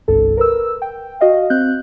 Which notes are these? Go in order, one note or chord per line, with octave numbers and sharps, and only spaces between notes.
G1 C2 G2 A4
A#4 B4 E6
G5
F#4 D#5 F5
C4 F#6 G6